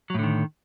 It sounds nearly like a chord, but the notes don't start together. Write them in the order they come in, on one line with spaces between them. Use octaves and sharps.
F#3 A2 D3 D#3